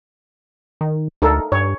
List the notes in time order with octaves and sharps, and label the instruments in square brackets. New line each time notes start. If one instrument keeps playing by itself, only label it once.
[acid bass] D#3
[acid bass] D2 [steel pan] D#4 A4 A#4
[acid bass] G2 [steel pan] C#5